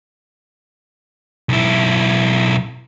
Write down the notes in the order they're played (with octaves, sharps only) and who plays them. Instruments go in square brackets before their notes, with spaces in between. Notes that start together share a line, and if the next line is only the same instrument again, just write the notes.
[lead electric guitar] B1 E4